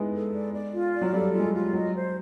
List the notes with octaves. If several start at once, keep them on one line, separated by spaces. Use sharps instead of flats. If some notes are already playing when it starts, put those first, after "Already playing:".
Already playing: G#3 B3 D#4 E4
A4
D5
D5
F4
D5
F#3
G3 A4
F4
G#3
G3
F4
F#3 D#5
C5